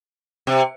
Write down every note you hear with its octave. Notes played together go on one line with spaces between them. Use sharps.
C3